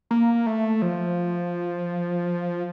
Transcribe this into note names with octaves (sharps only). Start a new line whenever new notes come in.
A#3
A3
F3